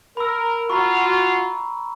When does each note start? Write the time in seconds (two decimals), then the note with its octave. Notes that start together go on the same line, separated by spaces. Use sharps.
0.17 A#4 B5 E6
0.70 F4 F#4 A#5 B5 C#6